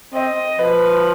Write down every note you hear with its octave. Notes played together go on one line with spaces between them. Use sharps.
C4 D#5
F3 B4